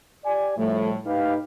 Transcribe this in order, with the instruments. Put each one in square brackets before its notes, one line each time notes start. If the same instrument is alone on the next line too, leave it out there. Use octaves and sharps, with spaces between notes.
[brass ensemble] G4 D5 G#5
[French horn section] A2 [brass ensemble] F3 G3 [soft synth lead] A3
[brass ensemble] A2 D#4 [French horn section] G4 B4 [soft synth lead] F5